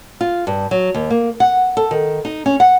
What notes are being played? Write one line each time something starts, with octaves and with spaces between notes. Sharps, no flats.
F4
G2
F#3
D#2
A#3
F#5
A4
D#3
D#4
C#4
F#5